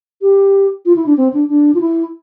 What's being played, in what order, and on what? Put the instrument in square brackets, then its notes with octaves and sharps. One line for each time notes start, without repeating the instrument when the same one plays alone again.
[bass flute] G4
F4
E4
D4
C4
D4
D4
F4
E4